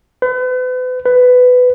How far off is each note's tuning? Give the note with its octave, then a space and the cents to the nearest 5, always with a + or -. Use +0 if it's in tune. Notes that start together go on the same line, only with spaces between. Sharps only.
B4 +40
B4 +15